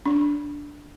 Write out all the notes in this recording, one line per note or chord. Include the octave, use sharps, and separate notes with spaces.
D4